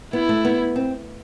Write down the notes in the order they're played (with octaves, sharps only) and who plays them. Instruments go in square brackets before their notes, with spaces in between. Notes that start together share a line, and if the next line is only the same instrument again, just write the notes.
[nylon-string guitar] B3 [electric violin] E4
[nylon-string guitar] A3
B3
C4